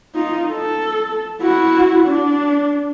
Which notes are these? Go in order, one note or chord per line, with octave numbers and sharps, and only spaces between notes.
D#4 F4
A4
E4 F#4
D4